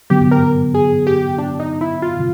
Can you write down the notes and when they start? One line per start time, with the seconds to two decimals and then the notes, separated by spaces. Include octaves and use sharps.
0.10 D3 F#3 B3 G4
0.31 A#4
0.74 G#4
1.07 G4
1.38 D4
1.60 D#4
1.81 E4
2.02 F4